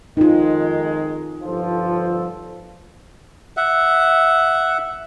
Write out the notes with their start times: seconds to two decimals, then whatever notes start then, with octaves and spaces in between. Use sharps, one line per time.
0.17 F2 D#3 G#3 D#4 F4
1.42 G1 F3 A4
3.57 E5 F#5